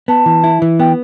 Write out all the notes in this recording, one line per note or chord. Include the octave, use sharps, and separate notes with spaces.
B3 A5
E3
E4
E3
B3 G5